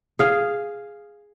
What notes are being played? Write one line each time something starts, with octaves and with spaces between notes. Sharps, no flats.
G#4 F5